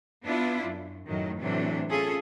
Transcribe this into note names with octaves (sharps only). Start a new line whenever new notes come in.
B3 D4 E4 F4
F#2
F#2 A2 D#3 F#3
A2 C3 E3 F#3 D4
C#4 F4 G#4 A4